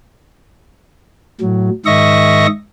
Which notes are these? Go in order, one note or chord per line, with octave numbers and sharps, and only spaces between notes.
A2 F#3
G#2 D#3 D#5 E5 C#6 A#6